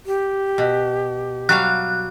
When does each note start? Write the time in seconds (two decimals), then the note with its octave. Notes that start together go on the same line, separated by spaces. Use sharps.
0.06 G4
0.58 B2
1.49 F#3 G3 F5 F#6